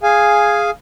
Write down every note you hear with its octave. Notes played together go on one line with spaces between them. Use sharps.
G#4 F5 G#5